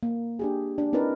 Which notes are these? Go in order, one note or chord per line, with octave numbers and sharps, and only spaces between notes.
A#3
D4 G4 G#4
D4
C4 D#4 E4 A#4 B4 D5